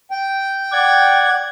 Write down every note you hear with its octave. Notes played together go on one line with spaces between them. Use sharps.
G5
D5 F#5 G#6